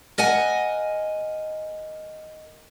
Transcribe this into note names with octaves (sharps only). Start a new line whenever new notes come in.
A#4 D#5 F#5 G#5